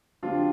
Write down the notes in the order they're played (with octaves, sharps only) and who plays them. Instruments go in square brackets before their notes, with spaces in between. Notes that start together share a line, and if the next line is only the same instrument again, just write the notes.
[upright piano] D3 F3 C4 G4 [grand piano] D4 F4